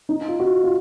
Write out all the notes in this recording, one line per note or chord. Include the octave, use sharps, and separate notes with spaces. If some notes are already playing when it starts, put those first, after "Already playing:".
D#4
F4
F#4
F4